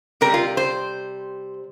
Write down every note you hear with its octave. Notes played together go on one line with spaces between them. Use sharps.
C3 G3 A#4
F4
C5